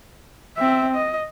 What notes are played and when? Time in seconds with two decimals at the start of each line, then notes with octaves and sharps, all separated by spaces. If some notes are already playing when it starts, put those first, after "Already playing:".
0.57 C4 E5
0.95 D#5